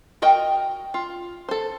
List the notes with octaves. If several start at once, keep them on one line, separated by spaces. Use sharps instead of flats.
F#4 A#4 D#5 G5
F4
A4 C5